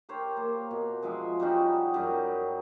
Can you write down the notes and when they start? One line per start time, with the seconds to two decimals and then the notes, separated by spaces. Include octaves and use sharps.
0.09 G4 A#4 C5 C#5
0.37 A#3
0.71 B2
1.02 F3 G#3 E5
1.40 G3 C#4 D#4 F#4
1.94 F#2 G3